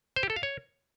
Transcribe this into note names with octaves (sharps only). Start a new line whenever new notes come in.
C5
G4
A4
F5
C#5